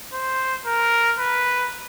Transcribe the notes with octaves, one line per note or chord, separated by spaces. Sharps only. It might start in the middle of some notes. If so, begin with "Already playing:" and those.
C5
A#4
B4